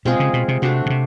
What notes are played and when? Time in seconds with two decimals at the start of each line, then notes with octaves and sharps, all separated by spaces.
0.05 B2 G#3 C4 F4 G#4
0.20 C#3
0.33 B2
0.48 C3
0.62 C3 A3 D4 F#4
0.86 B2
0.90 C3